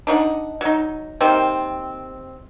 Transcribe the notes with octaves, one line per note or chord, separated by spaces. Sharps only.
D4 D#4 C#5 F#5
F#3 D#4
C3 D#3 A#3 C4